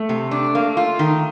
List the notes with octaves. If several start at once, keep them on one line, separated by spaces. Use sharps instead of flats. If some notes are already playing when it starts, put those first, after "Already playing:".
Already playing: A3
C3
D4
A#3
F4
D#3